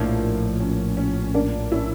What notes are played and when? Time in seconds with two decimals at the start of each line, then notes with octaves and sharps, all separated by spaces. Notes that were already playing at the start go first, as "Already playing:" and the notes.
Already playing: A#1 A2 F3 A#3 D4
0.60 C#4
0.97 C#4
1.34 A#3 D4
1.72 C#4 E4